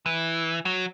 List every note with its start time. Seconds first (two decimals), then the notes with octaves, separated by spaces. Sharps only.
0.06 E3
0.65 F#3